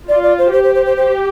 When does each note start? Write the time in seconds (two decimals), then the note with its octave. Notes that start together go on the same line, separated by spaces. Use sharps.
0.08 F4 D5
0.23 D5
0.38 C5
0.52 G4 C5
0.63 C5
0.75 C5
0.86 C5
0.97 C5